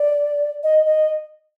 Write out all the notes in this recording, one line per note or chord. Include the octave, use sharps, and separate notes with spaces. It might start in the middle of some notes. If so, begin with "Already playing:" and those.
Already playing: D5
D#5
D#5